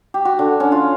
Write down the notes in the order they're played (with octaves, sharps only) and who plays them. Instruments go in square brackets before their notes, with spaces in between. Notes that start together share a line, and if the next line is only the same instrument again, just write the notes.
[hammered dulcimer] G4
F#4
D3
C#4
F4